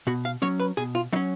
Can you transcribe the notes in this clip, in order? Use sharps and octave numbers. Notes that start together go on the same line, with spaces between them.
B2 F#4
F5
F#3 C#4 C#5
B4
B2 G#4
F4
F#3 C#4 D#4